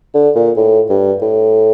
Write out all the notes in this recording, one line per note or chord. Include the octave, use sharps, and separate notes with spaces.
D3
A#2
A2
G2
A2